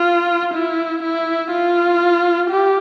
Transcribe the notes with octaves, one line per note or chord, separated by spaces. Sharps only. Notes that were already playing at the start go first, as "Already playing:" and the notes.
Already playing: F4
E4
E4
F4
G4